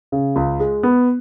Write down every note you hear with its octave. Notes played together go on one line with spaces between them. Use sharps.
C#3
C#2
G#3
B3